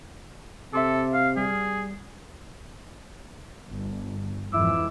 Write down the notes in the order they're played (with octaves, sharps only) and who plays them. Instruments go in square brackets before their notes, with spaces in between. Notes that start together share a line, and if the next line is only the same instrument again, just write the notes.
[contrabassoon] C3 [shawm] A4 [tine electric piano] E5 C6 D6
[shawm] F5
[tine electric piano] G3 [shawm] G#4
[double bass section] G1
[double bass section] F2 G#2 E3 [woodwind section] E4 D6 E6